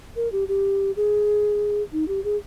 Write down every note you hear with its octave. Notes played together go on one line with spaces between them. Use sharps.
A#4
G4
G4
G#4
D#4
G4
G#4